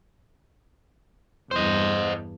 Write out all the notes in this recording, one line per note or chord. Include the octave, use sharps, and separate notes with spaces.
E2 G2 C5 D#5